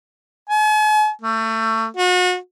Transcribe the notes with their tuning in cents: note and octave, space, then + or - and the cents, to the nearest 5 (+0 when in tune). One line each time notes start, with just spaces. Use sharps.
G#5 +45
A3 +25
F#4 -35